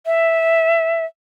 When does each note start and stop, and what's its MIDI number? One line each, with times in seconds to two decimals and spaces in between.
0.06 1.05 76